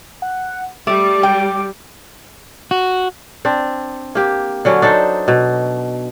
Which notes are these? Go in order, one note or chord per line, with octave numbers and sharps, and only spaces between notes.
F#5
G3 A3 D6
G5
F#4
C4 D4
A#3 G4
D3 F#3 C#4
D4 D#4 A4 C5
B2